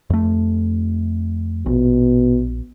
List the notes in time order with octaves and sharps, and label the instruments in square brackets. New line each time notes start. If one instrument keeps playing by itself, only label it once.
[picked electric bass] F2 A3
[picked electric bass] A#1 [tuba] B2